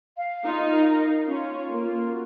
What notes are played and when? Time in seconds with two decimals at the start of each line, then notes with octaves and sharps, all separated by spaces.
0.17 F5
0.45 D#4 F4
0.72 A#4
1.00 F5
1.27 C#4 F4
1.55 F4
1.69 A#3
1.82 F4
2.09 F#4